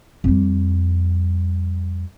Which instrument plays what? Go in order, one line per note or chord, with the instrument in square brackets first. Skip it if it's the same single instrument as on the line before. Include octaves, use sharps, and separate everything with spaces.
[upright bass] F2 G3